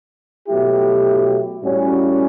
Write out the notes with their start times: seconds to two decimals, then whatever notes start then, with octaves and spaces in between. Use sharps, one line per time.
0.47 B2 F#3 A3 E4 G4
1.61 A2 G3 C#4 F#4